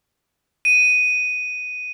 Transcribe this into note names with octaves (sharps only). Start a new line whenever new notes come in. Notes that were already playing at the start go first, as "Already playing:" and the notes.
D#7